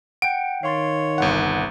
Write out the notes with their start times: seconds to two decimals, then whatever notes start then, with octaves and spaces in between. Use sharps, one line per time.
0.22 F#5 G5 D7
0.63 D#3 C#5 F5 C6 A6
1.18 G1 C2 F#5